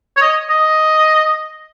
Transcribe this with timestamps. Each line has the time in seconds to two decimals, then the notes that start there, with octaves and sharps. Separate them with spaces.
0.17 C#5
0.22 D#5
0.50 D#5